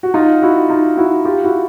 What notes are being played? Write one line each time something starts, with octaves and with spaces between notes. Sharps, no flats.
F#4
D#4 F4
E4 F#4
D#4 F4
E4 F#4
F4 G4
E4 F#4